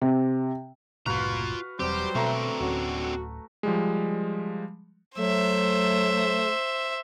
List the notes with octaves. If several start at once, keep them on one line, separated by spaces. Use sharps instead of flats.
C3
F#1 C2 A2 F4 F#4 B4 F5 A#5
E1 F#3 G3 C4 G4 C5
B2 D3 A3 C4 A#5
D1 C#4 F#4
F3 G3 G#3
F#3 A3 C5 E5